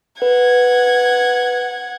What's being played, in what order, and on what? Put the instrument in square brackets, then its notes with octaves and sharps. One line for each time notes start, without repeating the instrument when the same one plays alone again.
[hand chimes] B4 [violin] F#5 G#6